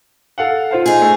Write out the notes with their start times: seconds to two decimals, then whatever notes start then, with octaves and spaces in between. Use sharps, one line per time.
0.38 A4 F5 F#5
0.71 F4 C5 F5
0.86 D#4 G#4
1.02 A3